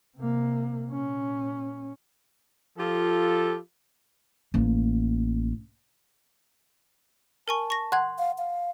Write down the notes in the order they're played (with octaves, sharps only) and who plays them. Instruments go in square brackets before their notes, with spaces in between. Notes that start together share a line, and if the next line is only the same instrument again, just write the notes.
[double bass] C3 A#3
A#2 C#4
[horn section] F3 F4 G4 A4
[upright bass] A1 A#3
[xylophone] A#4 G#5 C#6 [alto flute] A5
[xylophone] C#6 A#6
[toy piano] F#5 C6 [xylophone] F#6 G#6
[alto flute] F5
F5